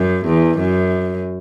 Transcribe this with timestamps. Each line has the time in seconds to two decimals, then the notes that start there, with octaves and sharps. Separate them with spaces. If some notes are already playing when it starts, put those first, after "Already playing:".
Already playing: F#2
0.26 E2
0.59 F#2